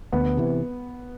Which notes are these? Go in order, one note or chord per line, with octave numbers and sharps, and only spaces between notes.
D2 B3
C3 E3